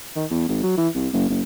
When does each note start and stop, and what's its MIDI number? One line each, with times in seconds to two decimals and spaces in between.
0.16 0.25 51
0.30 0.48 40
0.48 0.60 32
0.63 0.75 54
0.77 0.88 52
0.95 1.08 36
1.13 1.28 30
1.29 1.42 30